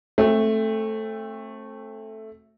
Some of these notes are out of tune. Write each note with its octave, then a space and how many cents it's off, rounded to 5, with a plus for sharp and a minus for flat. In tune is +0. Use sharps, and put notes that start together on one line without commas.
A3 +0 C4 +30 F#4 -5